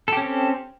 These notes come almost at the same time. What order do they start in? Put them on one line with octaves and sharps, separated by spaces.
A4 G4 C#4 C4